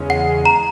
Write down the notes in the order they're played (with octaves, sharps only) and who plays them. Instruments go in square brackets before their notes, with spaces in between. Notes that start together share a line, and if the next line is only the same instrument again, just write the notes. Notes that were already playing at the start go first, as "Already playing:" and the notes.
Already playing: [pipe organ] E2 C#3 G#3 C#4
[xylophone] F#5
A#5